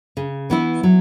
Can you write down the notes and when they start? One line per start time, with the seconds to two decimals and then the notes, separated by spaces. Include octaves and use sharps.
0.17 C#3
0.50 E3 B3 E4
0.83 F#3